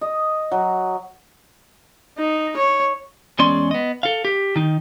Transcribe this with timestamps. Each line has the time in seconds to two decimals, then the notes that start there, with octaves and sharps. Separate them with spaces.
0.01 D#5
0.52 F#3
2.18 D#4
2.56 C#5
3.39 E2 G#3 C#4 D5 C6
3.71 B3 D#5
4.03 A4 F5
4.25 G4
4.56 D#3 D#4